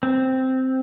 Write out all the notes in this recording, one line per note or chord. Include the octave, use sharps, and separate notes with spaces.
C4